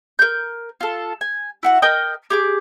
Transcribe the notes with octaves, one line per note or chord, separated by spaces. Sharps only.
A#4 G6
F4 A4
G#5
E4 F#4 F#5
A#4 D#5 G5 D#6
G4 G#4 D6